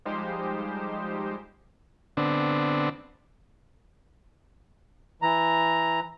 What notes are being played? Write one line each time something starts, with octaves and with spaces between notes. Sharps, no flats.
F3 G3 G#3 D#4 G4 C5
D3 B3 C4 D4
E3 A#5